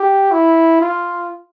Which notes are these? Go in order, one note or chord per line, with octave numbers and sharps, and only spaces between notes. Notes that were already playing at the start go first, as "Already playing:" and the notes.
Already playing: G4
E4
F4